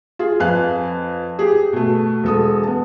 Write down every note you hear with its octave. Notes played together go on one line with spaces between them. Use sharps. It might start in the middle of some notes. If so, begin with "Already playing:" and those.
F4 G#4
F2 B4 F5 G#5 F#6
G4 G#4
B2 A3
E1 A4 D#6
B3 A5